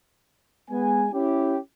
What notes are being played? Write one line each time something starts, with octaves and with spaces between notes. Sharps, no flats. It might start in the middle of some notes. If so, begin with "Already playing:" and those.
G#3 B3 G#5
C#4 E4 G4